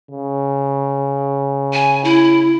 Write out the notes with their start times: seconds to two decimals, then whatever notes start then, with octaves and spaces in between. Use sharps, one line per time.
0.11 C#3
1.73 G#5
2.04 E4